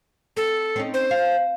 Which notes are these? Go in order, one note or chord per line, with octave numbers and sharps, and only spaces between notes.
C4 A4
C4 C#4 D#4
C5
F5